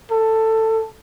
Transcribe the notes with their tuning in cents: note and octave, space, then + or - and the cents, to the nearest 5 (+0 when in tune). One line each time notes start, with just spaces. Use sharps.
A4 +15